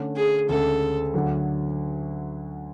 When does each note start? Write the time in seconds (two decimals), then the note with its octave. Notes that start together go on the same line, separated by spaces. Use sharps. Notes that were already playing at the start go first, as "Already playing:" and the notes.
Already playing: D3 A3 C#4
0.17 G#4
0.49 D2 C#3 G#3 C#4 G#4 A4
1.14 D2 D3 F#3